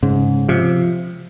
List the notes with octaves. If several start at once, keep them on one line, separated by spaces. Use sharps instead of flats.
G#2 C#3
C3 F3